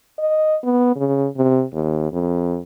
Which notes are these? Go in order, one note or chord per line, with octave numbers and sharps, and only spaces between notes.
D#5
B3
C#3
C3
D#2
F2